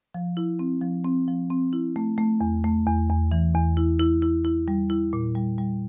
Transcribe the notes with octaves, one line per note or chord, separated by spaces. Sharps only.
F3
E4
C4
F3
C4
F3
C4
E4
A3
A3
E2
A3
E2
E2
E3
E2
E4
E4
E4
E4
G3
E4
A#2
G3
G3